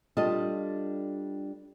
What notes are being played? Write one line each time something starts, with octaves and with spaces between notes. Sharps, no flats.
G3 D4 F4 A4 D#5